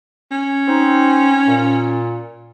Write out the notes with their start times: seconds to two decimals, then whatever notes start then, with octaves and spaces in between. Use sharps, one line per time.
0.31 C#4
0.68 C4 D#4
1.47 A#2